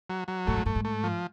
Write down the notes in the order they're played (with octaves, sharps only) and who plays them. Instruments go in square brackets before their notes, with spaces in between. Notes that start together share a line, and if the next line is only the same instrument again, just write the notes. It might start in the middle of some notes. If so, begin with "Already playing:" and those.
[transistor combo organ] F#3
F#3
[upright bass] A2 [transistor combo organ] A3
[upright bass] G#2
[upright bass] G2 [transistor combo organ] A3
[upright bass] G#2
[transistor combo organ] A3
F3